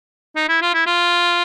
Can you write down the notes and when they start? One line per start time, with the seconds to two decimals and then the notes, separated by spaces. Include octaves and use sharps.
0.36 D#4
0.48 E4
0.62 F4
0.74 E4
0.86 F4